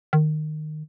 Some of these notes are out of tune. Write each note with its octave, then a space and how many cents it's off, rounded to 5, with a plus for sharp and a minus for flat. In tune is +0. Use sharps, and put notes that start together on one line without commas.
D#3 -20